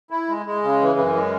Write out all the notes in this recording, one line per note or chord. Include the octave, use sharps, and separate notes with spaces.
E4
G#3
G#3
C#3
E3
F#2
G#3